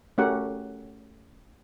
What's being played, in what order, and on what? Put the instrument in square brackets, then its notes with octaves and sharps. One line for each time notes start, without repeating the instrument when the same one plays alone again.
[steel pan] A3 C#4 F#4 G4 A#4 F#5